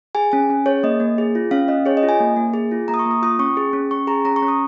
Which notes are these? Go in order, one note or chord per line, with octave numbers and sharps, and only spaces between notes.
G#4 G#5
C#4 G#5
C#4
G#4 C#5
A#3 D#5
A#3
G#4
F4
C#4 F5
C#4 D#5
G#4 C#5
D#5
F4
G#5
A#3
A#3
G#4
F4
A#3 A#5
D#6
C#6
A#3
D#6
F4 D#6
C#4 C#6
G#4
C#4
C#4 C#6
G#4 A#5
C#4 A#5
C#6
C#4
D#6